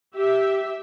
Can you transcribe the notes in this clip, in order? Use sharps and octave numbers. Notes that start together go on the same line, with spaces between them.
G4 E5